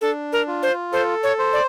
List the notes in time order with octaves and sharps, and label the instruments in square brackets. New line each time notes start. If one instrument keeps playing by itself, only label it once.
[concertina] D4 [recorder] A4
[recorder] A#4
[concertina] F4
[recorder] C5
[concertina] A4 [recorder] C5
[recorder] C#5
[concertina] C5
[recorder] D5